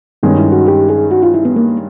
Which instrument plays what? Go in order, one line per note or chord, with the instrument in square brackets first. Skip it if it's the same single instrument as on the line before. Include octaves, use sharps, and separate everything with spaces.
[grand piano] G2 D#3 G#3 C#4 [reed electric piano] B3
[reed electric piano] E4
F#4
G4
G#4
F#4
F4
E4
B3
A#3